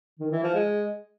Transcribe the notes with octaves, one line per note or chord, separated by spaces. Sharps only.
D#3
E3
F3
G#3